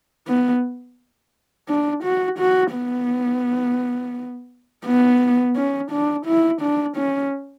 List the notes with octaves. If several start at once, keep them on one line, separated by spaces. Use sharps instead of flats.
B3
D4
F#4
F#4
B3
B3
C#4
D4
E4
D4
C#4